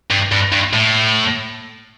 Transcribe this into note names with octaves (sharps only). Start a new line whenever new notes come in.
G2
G2
G2
A2